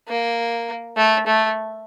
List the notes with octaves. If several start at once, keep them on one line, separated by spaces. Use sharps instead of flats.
A#3
A3
A3